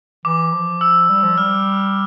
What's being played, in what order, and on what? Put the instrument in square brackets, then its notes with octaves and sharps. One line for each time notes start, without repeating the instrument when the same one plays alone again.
[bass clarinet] E3 [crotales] D6
[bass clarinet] F3
[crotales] E6
[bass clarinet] G3
F3
[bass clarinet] G3 [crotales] F6